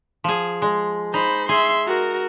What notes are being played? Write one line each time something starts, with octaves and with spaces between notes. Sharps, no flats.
F3 G#4
G#3
D#4 C5 B5
G#4 E5 C6
F#4 A#4